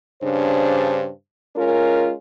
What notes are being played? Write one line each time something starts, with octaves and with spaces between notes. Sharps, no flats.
G2 C#3 D4 C5
G#3 C#4 F4 A#4